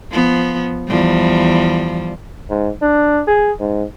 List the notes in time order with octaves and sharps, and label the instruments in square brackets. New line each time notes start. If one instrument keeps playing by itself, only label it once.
[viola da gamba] F3 B3
E2 F3 G3
[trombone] G#2
D4
G#4
G#2